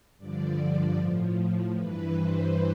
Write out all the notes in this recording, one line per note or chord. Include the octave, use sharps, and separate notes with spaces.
G2 D3 F3 D5
A2 F3
G2 E3 B4
C5